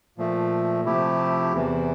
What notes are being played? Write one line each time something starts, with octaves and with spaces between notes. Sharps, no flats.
A#2 F3 A3
C3 F3 A3 E4 G4
E2 C3 E3